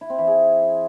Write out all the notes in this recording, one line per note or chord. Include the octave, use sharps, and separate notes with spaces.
E4
C4
E3
G#4